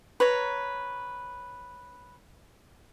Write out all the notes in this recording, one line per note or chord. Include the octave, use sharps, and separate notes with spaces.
B4 C#5 A#5